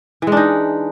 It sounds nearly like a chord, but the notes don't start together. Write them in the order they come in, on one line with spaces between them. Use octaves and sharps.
E3 G#3 D4 D#4